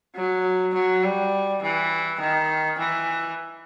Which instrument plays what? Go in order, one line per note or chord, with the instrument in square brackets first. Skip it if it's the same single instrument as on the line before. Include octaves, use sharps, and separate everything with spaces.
[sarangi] F#3
F#3
G3
E3
D#3
E3